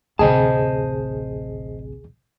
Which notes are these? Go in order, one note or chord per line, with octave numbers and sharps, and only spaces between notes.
A1 D2 C3 G#4 C5 D#5 A5